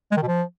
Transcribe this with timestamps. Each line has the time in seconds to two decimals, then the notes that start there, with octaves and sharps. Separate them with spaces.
0.11 G#3
0.17 D#3
0.22 B2
0.28 F3